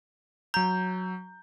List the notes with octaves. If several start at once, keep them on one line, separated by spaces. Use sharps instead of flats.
F#3 A#5 G6